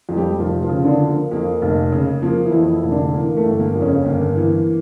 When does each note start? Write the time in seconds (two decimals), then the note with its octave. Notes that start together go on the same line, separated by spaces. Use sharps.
0.09 F2
0.16 G3 G4
0.39 F1 F3 F4
0.63 F3 F4
0.69 C#3
0.85 D3 D4
1.00 F3
1.08 A#3
1.31 F2 A#3
1.62 F1
1.92 C#3
2.22 F3 A#3
2.45 E3 E4
2.52 F2
2.68 E3 E4
2.83 F1
2.91 D3 D4
3.14 E3 A#3
3.37 A3
3.44 G1
3.60 A#3
3.75 F2
3.82 C#3 C#4
4.05 G1 A#3
4.36 E3